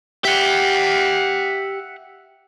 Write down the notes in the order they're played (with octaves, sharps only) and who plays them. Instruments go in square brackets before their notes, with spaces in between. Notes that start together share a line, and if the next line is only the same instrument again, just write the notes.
[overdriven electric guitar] G4 [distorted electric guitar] E5 F#5